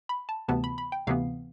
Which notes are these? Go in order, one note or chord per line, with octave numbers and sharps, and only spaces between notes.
B5
A5
D2 C3 E3 B3 A5
B5
B5
G5
D2 C3 E3 B3 F5